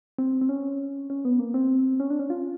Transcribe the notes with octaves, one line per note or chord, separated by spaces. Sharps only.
C4
C4
C#4
C#4
B3
A#3
C4
C#4
D4
C#4
F4